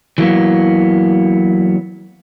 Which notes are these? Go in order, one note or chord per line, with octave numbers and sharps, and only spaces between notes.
E3 F#3 A#3 B3